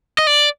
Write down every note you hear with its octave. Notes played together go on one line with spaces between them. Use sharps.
D#5
D5